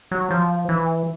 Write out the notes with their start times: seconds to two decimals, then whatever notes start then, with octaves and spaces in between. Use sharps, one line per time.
0.11 F#3
0.31 F3
0.69 E3